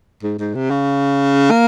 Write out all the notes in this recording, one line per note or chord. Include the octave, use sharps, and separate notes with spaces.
G#2
G#2
C3
C#3
A#3